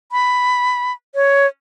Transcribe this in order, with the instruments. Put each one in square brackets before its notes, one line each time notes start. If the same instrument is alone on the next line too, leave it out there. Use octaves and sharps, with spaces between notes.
[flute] B5
C#5